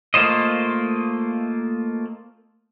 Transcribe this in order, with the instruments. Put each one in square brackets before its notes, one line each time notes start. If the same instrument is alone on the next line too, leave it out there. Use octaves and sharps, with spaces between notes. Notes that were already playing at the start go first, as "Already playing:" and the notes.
[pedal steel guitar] A3 A#3 F4 C5 D#5